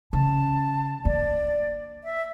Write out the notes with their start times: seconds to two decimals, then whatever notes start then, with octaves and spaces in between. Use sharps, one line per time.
0.13 C#3 A5
1.05 A#3 D4 D5
2.04 E5